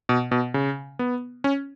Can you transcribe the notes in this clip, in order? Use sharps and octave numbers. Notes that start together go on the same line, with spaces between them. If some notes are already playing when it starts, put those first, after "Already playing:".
B2
B2
C#3
B3
C#4